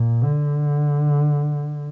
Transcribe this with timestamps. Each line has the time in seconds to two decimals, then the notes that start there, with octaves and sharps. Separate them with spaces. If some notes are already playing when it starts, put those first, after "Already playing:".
Already playing: A#2
0.23 D3